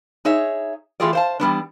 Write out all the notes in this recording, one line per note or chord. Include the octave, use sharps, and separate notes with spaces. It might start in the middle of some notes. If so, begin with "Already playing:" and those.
D#4 G#4 C#5 E5
E3 A3 F4 G4 G#4 D5
C5 F5 A5
E3 G3 B3 D4